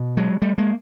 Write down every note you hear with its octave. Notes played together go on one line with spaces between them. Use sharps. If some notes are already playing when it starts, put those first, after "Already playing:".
Already playing: B2
F#3 G#3
G3 A3
G#3 A#3